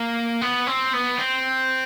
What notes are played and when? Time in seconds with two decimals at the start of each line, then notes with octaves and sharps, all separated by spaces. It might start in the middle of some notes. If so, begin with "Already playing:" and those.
Already playing: A#3
0.41 B3
0.67 C4
0.93 B3
1.19 C4